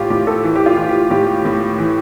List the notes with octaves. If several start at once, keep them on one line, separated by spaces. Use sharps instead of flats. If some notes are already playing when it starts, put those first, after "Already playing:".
Already playing: A2 E3 F4 G4
A2 G4
A4
E3
G4
F4
E3
G4
A2 G4
A2
E3